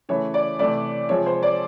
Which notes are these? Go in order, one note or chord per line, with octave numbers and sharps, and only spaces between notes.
C#3 E3 A3 C#5
D5
C3 E3 A3 D5
C3 F3 G#3 C#5
C5
D5